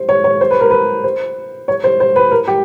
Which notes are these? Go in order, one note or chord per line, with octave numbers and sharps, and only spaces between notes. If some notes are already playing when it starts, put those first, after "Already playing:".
Already playing: C5
C#5
C#5
C5
B4
A#4
B4
C5
C#5
C5
C5
B4
A#4
G4